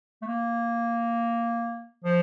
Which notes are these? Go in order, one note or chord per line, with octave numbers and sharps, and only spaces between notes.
A3
A#3
F3